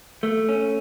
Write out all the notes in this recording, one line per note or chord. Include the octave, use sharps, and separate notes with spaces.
A3
C#4